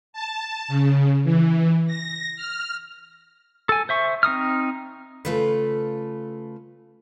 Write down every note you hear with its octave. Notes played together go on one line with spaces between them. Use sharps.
A5
C#3
E3
A#6
F6
A4 G#5
C5 E5 C#6
C4 D#4 D#6 F6
C#3 A3 F4 A4 B4